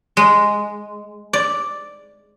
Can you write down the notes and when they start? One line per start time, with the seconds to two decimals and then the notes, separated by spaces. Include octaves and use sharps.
0.17 G#3
1.33 D5